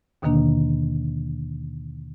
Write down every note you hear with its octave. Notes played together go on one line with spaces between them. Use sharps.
D#2 B2 D3 D#3 A#3 D4